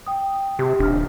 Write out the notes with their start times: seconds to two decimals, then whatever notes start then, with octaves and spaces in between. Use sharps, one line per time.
0.07 G5 D#6
0.59 C3 G4
0.79 D#1 D4 F6